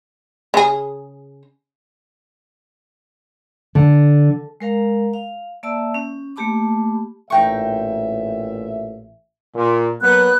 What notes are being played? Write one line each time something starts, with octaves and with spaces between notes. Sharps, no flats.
C#3 G#4
D3
G#3 A#4 F5 A#5
F5
A#3 D5 E5 A5 E6
C#4
A3 A#3 G4 A5 B5 D6
A1 A#2 D#4 E5 G5 C#6
A#2
F#3 A#3 B3 F#6